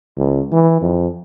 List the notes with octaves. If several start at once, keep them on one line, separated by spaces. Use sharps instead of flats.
C#2
E3
F2